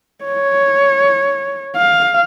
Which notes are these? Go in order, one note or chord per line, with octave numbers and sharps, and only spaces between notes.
C#5
F5